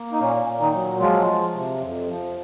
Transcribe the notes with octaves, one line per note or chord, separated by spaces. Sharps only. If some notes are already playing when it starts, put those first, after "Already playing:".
Already playing: A#3
D#4
A#2 C#4
A#2
D#3 D#4
F#3
F3 G#3 F4
F3
C3
F2
F3